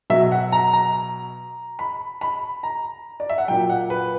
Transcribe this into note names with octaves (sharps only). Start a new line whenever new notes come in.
B2 F#3 E5
F#5
A#5
A#5
B5
B5
A#5
D5
E5
F#5
A#2 F#3 G5
F#5
B4